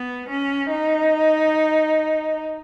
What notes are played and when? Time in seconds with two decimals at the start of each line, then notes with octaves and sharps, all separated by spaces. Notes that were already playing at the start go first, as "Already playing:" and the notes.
Already playing: B3
0.28 C#4
0.71 D#4